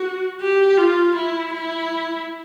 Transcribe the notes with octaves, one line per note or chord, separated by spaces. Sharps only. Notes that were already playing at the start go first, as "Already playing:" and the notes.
Already playing: F#4
G4
F4
E4
E4